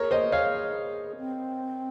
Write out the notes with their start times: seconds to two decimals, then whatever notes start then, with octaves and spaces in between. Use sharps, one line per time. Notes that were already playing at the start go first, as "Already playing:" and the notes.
Already playing: G#4 A#4 C#5
0.11 C5 D#5
0.32 C#5 F5
1.17 C4